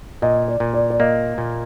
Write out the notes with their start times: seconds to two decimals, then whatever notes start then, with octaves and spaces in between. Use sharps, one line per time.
0.22 A#2 D#5
0.48 D5
0.60 A#2
0.74 D5
0.90 D5
1.00 A#3 D#5
1.38 A#2